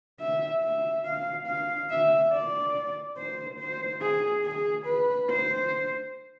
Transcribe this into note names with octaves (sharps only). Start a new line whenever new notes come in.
E5
E5
F5
F5
E5
D5
C5
C5
G#4
G#4
B4
C5